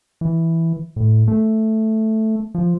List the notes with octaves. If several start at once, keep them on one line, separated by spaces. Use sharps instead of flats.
E3
A2
A3
F3